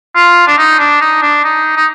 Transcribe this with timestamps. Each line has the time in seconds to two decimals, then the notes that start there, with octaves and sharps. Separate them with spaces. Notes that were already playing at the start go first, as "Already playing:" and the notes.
0.15 F4
0.47 D4
0.58 D#4
0.79 D4
1.01 D#4
1.22 D4
1.44 D#4
1.76 D#4